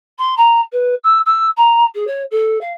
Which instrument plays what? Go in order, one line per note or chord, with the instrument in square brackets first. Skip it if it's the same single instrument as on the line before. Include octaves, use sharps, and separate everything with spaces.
[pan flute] C6
A#5
B4
E6
E6
A#5
G#4
C#5
A4
F5